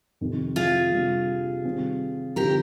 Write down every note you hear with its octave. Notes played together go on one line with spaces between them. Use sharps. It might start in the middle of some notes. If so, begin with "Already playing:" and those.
F2 C3 D#3
F4 G#4
C3 G3 D4
C3 D#3 G3 C4
D3 F3 C4 D#4 G4 A#4